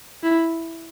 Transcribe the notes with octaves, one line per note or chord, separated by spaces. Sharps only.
E4